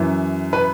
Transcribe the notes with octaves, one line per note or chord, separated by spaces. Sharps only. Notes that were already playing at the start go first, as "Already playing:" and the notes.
Already playing: F#2 E3
B4